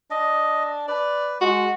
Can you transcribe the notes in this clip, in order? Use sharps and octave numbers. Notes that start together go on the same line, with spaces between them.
D4 D#5
B4 D5
G#3 F#4